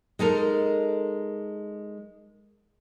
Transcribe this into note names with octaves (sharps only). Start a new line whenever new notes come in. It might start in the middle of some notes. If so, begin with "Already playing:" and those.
G#3 D#4 A4 A#4